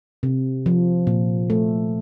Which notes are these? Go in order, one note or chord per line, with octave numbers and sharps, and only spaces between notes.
C3
F3
A#2
A3